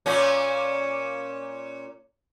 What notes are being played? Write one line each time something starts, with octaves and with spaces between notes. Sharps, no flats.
A#2 C#4